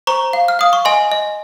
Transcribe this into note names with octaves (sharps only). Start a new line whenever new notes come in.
C5 A#5 C#6
F5
F6
F5 D#6
C#6
D#5 G#5 C6
D#5